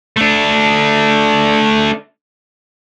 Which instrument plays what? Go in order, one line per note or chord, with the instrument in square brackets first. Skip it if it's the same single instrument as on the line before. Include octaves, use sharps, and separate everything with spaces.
[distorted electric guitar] A3 D4